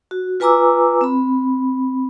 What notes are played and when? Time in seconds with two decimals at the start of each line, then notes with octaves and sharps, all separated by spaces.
0.11 F#4
0.40 F4 B4 G#5 A#5 D6 E6
1.01 C4 B5